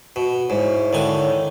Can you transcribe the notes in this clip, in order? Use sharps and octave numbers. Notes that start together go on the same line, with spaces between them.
B2
G#2 E4 C#5
D3 D#3 G#5